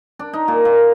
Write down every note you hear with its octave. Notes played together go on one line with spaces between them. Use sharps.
D4
D#4
A#2
A#2